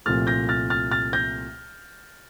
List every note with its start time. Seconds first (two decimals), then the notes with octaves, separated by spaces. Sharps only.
0.06 C2 A#2 F3 A3 F6 A6
0.27 G6 A#6
0.49 F6 A6
0.70 F6 A6
0.91 F6 A6
1.13 G6 A#6